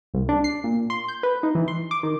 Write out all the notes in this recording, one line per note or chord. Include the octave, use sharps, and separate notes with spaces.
C2
D4
C7
A#2
C6
G6
B4
D#4
E3
C6
D6
D#3